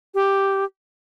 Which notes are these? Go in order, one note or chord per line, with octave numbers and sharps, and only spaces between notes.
G4